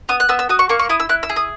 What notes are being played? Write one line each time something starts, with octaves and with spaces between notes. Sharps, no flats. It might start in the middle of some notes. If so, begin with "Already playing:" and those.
B3 D#6
F#6
B3 E6
E6
F#4 D#6
C#6
A#3 C#6
C#6
E4 D#6
E6
E4 F#6
E6
G#4
D#6